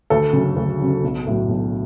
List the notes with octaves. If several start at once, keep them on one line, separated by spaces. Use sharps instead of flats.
D2 A4
C#3 F#3
D2
C#3 F#3
B1
A2 F#3
B1